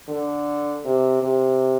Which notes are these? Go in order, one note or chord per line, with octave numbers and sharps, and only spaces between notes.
D3
C3
C3